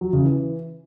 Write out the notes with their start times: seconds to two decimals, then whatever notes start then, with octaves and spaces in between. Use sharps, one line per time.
0.01 F#3
0.13 C#3
0.25 E3